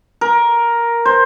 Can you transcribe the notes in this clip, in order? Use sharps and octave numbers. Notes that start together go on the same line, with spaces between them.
A#4
C5